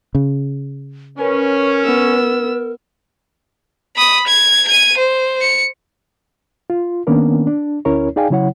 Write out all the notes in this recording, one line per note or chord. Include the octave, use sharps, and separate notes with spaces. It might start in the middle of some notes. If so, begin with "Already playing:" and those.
C#3
C#4 A#4 B4
B3 E6
B5 D#6
G#6
G#6 D#7
C5
C#7
F4
D#3 A#3 B3 C#4 D4 A#4
D4
D2 C#4 E4 A#4 C#5
D#4 G#4 D5 F5 G5 G#5
C#3 F#3 E4 C#5 F#5